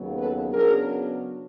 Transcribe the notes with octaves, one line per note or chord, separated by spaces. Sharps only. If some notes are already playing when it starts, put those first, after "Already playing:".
Already playing: D#2 C#3 F#3 B3
A4 B4
C#3 F#3 B3 D4 G#4 A#4